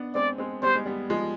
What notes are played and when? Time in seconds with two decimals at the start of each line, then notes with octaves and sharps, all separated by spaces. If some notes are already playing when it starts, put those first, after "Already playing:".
Already playing: B3 D4
0.15 G#3 C4 D5
0.38 G#3 C4
0.62 G3 B3 C5
0.75 G#3
0.86 G3 B3
1.10 F3 G#3